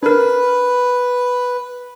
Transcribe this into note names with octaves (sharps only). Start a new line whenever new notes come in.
D4 A#4 B4